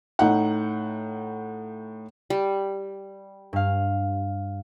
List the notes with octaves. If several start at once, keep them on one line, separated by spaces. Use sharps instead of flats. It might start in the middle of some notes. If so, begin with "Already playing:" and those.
A2 D#4 F#5
G3
G2 F5